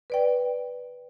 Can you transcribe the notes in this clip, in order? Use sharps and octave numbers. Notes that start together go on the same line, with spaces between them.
B4 D5 G5